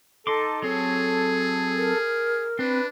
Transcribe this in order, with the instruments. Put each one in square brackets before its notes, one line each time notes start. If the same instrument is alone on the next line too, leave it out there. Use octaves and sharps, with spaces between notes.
[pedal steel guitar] D#4 C6 D6 [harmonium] A4
[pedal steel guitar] F#3 C4 C#5 [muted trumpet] G#4 [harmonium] A4
[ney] A#4
[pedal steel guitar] C4 [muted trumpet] D4 [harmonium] B4